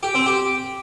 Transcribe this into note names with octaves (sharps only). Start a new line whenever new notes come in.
G4
C4
G4